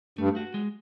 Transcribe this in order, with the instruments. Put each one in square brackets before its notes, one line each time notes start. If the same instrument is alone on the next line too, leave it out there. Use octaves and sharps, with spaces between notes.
[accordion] G2 [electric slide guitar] A3
[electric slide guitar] F#4
G#3